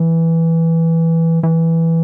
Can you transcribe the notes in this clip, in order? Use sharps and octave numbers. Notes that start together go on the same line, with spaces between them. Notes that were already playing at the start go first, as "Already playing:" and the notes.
Already playing: E3
E3